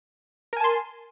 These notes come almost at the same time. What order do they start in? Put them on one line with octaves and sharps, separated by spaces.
A#4 G#5 A5 C6